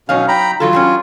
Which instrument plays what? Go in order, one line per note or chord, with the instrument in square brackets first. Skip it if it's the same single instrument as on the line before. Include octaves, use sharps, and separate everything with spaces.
[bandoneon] B2 C#4 [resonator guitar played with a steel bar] F#3 D#4 F5
[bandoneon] G5 A#5 B5
[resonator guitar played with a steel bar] E3 F#3 A4 [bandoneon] F4
[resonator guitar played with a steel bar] F#3 G3 C#4